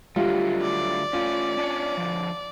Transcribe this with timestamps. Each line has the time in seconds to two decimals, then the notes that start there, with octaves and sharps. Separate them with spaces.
0.16 D3 F#3 G3 A3 F4
0.62 D5
1.13 A3 C#4 F4
1.57 C#4 D4 C#5
1.97 D3 F3